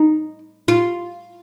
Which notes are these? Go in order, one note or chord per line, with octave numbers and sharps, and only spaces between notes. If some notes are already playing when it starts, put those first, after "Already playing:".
Already playing: D#4
F4